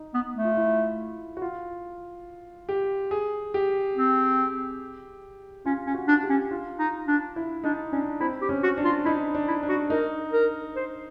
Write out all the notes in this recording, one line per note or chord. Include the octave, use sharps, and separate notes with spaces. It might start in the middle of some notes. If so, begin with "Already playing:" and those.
Already playing: D#4
B3
A3
F4
E4
F#4
F4
G4
G#4
G4
C4
C#4 F4
C#4
F#4
D4
G4
C#4
F4
D#4
D4
E4
D4 D#4
C#4 D4
C4 E4
G4
C#4
F#4
D4
F4
D#4 E4
D4
E4
D4
F#4
D#4 A#4
A#4
C5